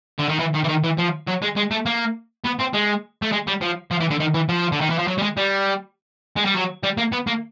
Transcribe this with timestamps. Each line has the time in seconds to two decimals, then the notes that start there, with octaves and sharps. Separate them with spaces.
0.18 D3
0.29 D#3
0.39 E3
0.54 D#3
0.64 E3
0.68 D#3
0.84 E3
0.98 F3
1.27 F#3
1.42 G#3
1.56 G#3
1.71 A3
1.86 A#3
2.44 B3
2.59 C4
2.73 G#3
3.22 A3
3.32 G#3
3.47 G3
3.61 F3
3.91 F3
4.00 E3
4.10 D3
4.20 D#3
4.34 E3
4.49 F3
4.72 D3
4.81 D#3
4.90 E3
4.99 F3
5.08 F#3
5.18 G3
5.22 G#3
5.37 G3
6.36 G#3
6.45 G3
6.54 F#3
6.83 G3
6.98 A#3
7.12 B3
7.27 A#3